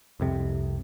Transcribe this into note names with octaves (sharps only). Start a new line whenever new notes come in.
C2 F2 C3